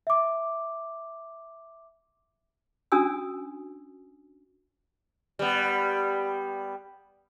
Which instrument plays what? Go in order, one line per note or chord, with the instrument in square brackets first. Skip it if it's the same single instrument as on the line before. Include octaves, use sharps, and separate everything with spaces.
[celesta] E5 D6
[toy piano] C#4 D4 F#4 G#5 D#6 E6
[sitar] G3 B3